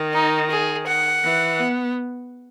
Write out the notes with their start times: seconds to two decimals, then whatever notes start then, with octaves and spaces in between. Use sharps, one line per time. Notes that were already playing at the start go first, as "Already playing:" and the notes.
Already playing: D#3
0.13 D#4
0.50 G#4
0.87 F#5
1.23 E3
1.60 B3